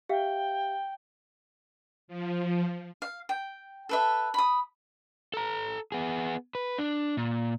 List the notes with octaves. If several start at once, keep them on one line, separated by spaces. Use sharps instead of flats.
G4 E5 F5 G5
F3
F5
G5
A4 B4 E5
B5 D#6
A4 A#5
B3 G#4
B4
D4
A#2